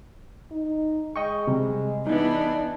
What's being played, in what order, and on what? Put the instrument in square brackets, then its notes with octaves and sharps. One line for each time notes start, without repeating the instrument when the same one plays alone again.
[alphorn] D#4
[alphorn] G#3 [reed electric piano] D#5 G5 C#6
[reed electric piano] C3 G3
[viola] E3 B3 [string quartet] D4 [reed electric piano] D#4 D#5